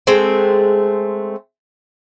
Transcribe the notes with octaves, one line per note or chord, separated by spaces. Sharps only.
G#3 A3 C4